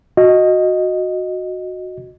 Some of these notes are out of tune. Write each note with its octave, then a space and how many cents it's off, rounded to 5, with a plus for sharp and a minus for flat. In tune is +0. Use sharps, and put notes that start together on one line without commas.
F#4 -10 D#5 +0